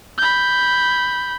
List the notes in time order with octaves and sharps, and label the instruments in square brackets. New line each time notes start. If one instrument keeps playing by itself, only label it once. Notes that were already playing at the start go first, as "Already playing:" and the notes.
[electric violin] B5 G6